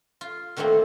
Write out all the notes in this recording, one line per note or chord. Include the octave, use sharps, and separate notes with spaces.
F4
D3 D#3 A3 A#3 C4